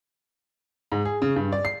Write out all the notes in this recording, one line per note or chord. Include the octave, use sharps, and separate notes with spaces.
G#2
G#4
C#3
G2
D5
C7